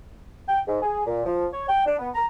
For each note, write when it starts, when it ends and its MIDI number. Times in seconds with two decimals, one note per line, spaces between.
0.49 0.60 79
0.67 0.81 44
0.82 1.02 68
1.06 1.22 46
1.26 1.46 53
1.53 1.68 73
1.68 1.84 79
1.86 1.98 62
1.98 2.09 59
2.15 2.26 82